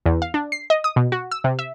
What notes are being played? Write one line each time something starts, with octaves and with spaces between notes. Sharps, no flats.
E2
F5
D4
C7
D#5
D#6
B2
F#4
E6
C3
E5